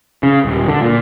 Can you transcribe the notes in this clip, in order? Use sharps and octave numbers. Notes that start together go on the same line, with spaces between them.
C#3
D#1
D3
A#2